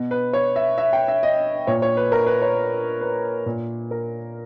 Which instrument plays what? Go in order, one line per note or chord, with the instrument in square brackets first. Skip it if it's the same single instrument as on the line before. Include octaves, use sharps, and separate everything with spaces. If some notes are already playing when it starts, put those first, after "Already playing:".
Already playing: [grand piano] B2
B4
C#5
E5
E5
G5
E5
D#5
A#2 C#5
C#5
B4
A#4
B4
C#5
B4
A#2
A#4